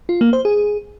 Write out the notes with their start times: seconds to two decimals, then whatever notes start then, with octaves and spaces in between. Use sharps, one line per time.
0.09 F4
0.21 A#3
0.33 C5
0.45 G#4